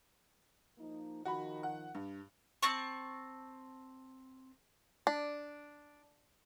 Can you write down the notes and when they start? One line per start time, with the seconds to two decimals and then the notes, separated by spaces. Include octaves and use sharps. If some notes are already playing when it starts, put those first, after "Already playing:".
0.78 F3 A#3 D#4
1.25 D#3 F3 F#4 B5
1.63 F#5
1.95 G2
2.63 C4 A5 C#6
5.07 D4